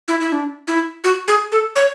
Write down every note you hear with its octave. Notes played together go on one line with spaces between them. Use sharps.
E4
E4
D4
E4
F#4
G#4
A4
C#5